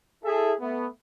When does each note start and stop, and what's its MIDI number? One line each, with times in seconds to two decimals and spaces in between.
0.24 0.53 64
0.24 0.53 68
0.24 0.53 69
0.24 0.53 76
0.60 0.87 57
0.60 0.87 59